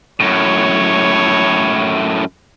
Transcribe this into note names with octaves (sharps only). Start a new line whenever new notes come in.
F#2 A2 C#5